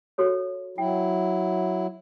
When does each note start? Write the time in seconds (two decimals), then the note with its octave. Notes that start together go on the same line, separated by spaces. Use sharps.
0.18 F#4 A4 C#5
0.78 F#3 E4 G5